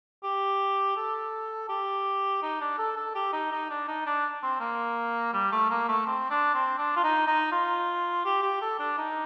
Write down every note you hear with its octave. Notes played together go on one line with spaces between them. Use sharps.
G4
A4
G4
D#4
D4
A4
A4
G4
D#4
D#4
D4
D#4
D4
C4
A#3
G3
A3
A#3
A3
C4
D4
C4
D4
F4
D#4
D#4
F4
G4
G4
A4
D4
D#4